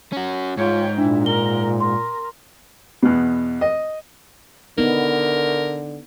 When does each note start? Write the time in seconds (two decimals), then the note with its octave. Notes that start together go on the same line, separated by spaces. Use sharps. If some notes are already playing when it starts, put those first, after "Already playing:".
0.12 C#4 F#4
0.57 G#2 F4 C#5 G5
0.98 A#2 D4 E4
1.26 A#4 G7
1.80 A#4 C6
3.03 E2 B2
3.61 D#5
4.78 D3 B3 D#4 A#4